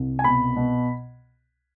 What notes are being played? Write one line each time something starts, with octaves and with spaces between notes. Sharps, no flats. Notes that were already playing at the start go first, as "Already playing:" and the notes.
Already playing: C2
G#5
B2 B5
B2